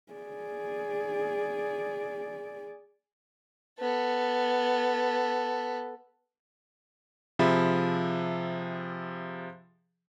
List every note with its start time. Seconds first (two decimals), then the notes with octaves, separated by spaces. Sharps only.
0.13 G#4 D5
3.79 B3 A4
7.39 C3 F3 G#4 E5 B5